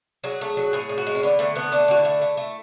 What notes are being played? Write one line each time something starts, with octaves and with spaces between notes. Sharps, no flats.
F#3 G#4
A3
F#3
A2 G#4
A2
F#4
G#3
C#4
D3 B3
D3 A3
A3 B3
A3 D4
D3 F#4
E4
A3
A3
A3